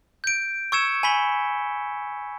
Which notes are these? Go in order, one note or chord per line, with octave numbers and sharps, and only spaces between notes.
G6 D7
C#6 E6 G#6 C#7 E7
G#5 B5 B6 G7